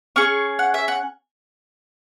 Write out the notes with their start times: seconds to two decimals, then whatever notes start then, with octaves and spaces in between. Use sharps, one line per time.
0.16 C#4 G#4 C#6
0.59 F#5
0.74 E5
0.88 F#5